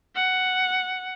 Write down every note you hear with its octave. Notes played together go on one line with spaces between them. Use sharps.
F#5